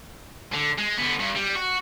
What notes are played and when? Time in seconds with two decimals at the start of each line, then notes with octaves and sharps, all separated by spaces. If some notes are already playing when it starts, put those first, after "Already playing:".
0.54 D3
0.78 G#3
0.98 D3 B3
1.19 G2
1.35 G3
1.55 F#4